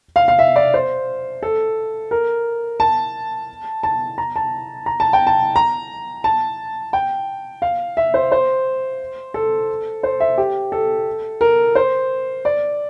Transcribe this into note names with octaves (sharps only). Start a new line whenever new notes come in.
F5
F5
E5
D5
C5
A4
A#4
A5
A5
A#5
A5
A#5
A5
G5
A5
A#5
A5
G5
F5
E5
C5
C5
A4
C5
E5
G4
A4
A#4
C5
D5